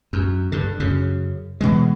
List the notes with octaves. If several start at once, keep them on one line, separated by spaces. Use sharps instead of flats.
F#2
G2 D3
F#2 C#3
B2 E3 G#3